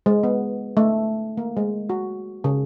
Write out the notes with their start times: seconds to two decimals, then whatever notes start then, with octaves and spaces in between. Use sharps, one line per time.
0.06 G#3
0.23 B3
0.77 A3
1.37 A#3
1.57 G#3
1.90 F#4
2.44 C#3